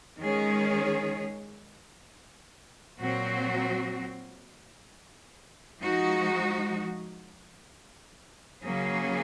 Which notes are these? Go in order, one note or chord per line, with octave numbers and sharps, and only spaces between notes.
D#3 G#3 C#4 G#4 C#5
A#2 F#3 C4 F#4
F3 G#3 D#4 F#4
C#3 F#3 A#3 C#4 G#4